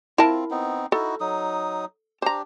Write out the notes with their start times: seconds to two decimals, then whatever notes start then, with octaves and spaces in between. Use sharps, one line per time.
0.18 C4 E4 F4 A#4 A5
0.51 B3 C4 D#4
0.92 D#4 E4 F#4 A4
1.20 F#3 D#4 D#6
2.22 D4 G4 C5 A#5